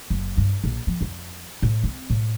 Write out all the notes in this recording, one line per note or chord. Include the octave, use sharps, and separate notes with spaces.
F#1
G2
A#1
F3
F2
A2
C4
A2